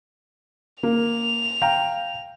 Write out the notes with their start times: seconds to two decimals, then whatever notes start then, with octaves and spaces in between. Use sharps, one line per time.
0.83 A#3 F7
1.62 F5 G5 A#5